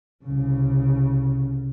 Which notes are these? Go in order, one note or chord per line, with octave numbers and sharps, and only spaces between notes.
C2 C#3